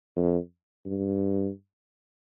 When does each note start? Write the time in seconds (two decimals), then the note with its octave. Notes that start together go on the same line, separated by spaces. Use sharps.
0.16 F2
0.86 G2